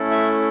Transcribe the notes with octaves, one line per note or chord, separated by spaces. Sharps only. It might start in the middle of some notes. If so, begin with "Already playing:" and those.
Already playing: A3 C#4 E4 A4
E5